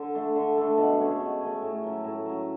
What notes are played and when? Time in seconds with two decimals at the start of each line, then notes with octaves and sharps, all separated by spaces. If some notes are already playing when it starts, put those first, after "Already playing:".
Already playing: D3
0.15 A3 D4
0.36 D3
0.58 A3 D4
0.77 B2
0.99 A3 C#4 G#4
1.20 B2
1.41 A3 C#4 G#4
1.62 A2
1.84 F#3 C#4
2.04 A2
2.25 F#3 C#4